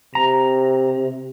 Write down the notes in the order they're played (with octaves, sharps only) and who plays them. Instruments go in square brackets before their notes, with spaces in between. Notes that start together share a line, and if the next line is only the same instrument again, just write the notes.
[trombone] C3 [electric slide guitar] A#5